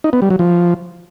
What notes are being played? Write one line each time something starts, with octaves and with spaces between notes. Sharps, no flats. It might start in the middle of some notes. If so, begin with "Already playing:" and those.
D#4
B3
G3
F#3
F3